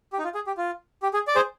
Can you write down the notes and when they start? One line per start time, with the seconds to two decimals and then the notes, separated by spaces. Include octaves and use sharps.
0.13 G4
0.19 D#4
0.24 F4
0.35 G#4
0.47 G4
0.57 F4
1.03 G4
1.14 G#4
1.28 D5
1.35 G#4 C5